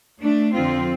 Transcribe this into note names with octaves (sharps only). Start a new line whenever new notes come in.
A3 D4
F2 D3 F3 C4 F4